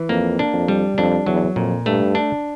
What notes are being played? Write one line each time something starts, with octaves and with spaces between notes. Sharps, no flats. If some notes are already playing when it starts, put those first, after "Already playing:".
Already playing: E3
F2 A#3
D4
F2
G3
F2 D4
E2 F#3
F2 A#2
G2 A3
D4